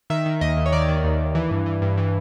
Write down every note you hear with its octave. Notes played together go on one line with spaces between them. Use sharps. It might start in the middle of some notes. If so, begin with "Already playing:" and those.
D#3 E5
D#3
D#2 D#5
D#2
C#5
D#3 D5
D#3
D#2
D#2
E3
G2
E3
G2
E3